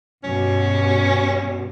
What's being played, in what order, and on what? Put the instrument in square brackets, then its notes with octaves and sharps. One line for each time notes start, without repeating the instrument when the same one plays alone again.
[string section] G2 B2 [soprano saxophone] C#4